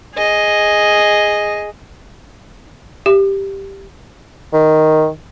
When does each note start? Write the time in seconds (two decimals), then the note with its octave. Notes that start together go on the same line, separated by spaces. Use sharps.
0.15 G#4 D#5
3.06 G4
4.53 D#3